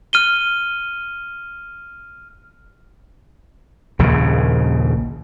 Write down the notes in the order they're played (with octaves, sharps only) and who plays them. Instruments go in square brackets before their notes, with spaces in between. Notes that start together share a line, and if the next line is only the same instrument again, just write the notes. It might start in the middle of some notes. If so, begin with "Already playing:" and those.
[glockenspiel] F6 D#7 G7
[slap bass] A#1 D#2 C#3